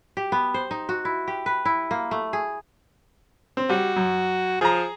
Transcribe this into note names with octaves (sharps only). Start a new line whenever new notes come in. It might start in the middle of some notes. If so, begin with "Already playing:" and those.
G4
B3
C5
D#4
F#4
E4
G4
B4
E4
A#3
A3
G#4
C4
G3 F#4
F#2
F3 G#4 A#5